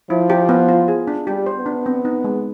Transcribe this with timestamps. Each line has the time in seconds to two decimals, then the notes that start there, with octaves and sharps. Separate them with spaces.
0.10 F3 E4
0.30 G4
0.49 B3
0.69 F4
0.88 G#4
1.07 D4
1.27 G3 G4
1.46 C5
1.56 B3
1.66 D4
1.86 C4
2.05 D#4
2.24 G#3